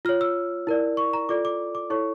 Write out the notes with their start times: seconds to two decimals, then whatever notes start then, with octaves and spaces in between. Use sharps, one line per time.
0.05 F4 C#5 F6
0.21 E6
0.67 E4 A#4 D5
0.97 C#6
1.13 A#5
1.29 F4 A4 D5 D6
1.45 D6
1.75 D6
1.90 E4 A4 C#5 C#6